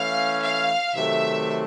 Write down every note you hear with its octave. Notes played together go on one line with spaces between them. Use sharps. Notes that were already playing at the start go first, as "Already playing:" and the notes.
Already playing: E3 A3 C#4 F5
F5
C3 D#3 F#3 A3 E5